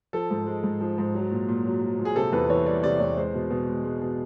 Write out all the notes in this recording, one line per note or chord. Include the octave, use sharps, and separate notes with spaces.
F3 A4
G#2
G#3
G#2
F3
G#2
F#3
A#2
A#2
F#3
F#3
A#2
G#4
C3 A4
E2 B4
E3 C#5
G3 D5
C3 D5
E2 C#5
G#3 C5
B2
B2
G#3
G#3
B2